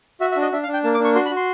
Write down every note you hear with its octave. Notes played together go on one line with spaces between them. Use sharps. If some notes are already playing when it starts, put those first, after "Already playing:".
F#4 E5
E5
D4
D#5
D4 E5
F5
D4
G5
A#3 A5
D6
D4
C#6
F#4 C6
B5
F#4
C6